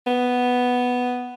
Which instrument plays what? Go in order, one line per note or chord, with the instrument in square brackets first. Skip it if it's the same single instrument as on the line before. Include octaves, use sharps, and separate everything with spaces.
[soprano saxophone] B3